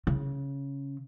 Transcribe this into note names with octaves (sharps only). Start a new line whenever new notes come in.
C#3